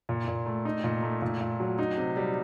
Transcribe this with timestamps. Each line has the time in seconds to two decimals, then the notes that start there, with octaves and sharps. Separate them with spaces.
0.09 A#2
0.28 A#2
0.46 A3
0.65 D#4
0.84 A#2
1.03 A3
1.22 A#2
1.41 A#2
1.60 F#3
1.79 D#4
1.97 C3
2.17 G3